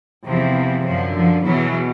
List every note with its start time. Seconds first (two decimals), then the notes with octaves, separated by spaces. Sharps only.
0.25 E2 C3 E3 F3
0.83 F#2 D3 F3
1.13 F3
1.42 E2 B2 E3 F#3